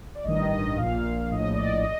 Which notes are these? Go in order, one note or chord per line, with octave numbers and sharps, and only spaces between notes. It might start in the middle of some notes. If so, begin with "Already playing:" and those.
D5
A1 G2 D#3 D#5
D#5
A#1 A#2 F5
A#1 A2 D#5
D5
D#5
D#5